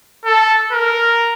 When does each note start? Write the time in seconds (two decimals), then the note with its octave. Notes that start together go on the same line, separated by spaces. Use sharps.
0.25 A4
0.72 A#4